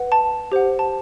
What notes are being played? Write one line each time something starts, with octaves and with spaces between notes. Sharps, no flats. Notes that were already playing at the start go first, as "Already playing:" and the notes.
Already playing: B4 F#5
A5
G4 C5 F#5
A5